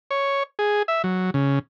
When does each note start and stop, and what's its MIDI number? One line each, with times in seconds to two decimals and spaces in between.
0.11 0.43 73
0.59 0.83 68
0.88 1.02 76
1.04 1.30 54
1.34 1.59 49